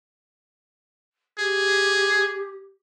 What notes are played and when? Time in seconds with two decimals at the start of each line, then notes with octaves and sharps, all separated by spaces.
1.38 G4 G#4